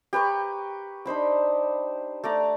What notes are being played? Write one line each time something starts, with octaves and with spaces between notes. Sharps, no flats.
G4 B4 A#5 C#6
D4 D#4 C5 B5
A3 D5 A#5